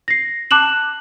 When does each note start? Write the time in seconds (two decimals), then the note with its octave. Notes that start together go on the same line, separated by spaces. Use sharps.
0.08 A#6 C7
0.51 A5 D6 F#6 E7 F#7